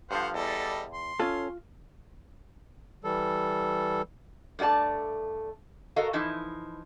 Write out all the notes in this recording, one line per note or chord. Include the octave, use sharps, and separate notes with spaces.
G2 D3 F3 C5 F5 F#5
E2 G3 A4 D#5
C6
C#4 F4 A4
E3 G3 A4
G2 A3 F#4 D5 A5
F#4 A4 A#4 D#5 F5
E3 F3 D#4 E4